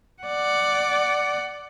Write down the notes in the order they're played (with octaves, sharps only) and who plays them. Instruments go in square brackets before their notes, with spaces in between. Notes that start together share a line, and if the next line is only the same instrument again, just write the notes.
[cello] D5 F#5